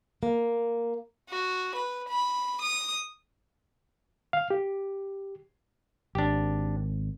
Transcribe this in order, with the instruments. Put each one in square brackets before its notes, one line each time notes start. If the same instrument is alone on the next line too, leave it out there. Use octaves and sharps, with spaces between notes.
[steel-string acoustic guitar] A#3
[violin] F#4
B4
B5
D#6
[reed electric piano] F5
G4
[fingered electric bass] G#1 [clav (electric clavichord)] D4 G4